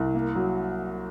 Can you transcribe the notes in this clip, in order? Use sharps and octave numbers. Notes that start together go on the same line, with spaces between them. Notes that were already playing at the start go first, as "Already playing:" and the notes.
Already playing: C2
A#3
F#3